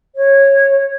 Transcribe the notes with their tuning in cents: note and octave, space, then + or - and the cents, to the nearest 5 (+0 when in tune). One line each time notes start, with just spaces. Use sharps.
C#5 -15